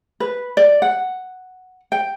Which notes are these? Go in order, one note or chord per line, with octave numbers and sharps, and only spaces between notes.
B4
D5
F#5
G5